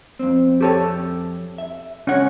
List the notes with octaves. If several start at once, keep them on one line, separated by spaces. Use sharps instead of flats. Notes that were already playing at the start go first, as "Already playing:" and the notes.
F2 C4
G4 A4 C#5
E5
C#2 C#4 C#5 F#5